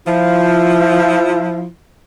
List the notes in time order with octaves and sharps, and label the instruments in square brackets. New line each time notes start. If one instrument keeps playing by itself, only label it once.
[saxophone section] F3 E4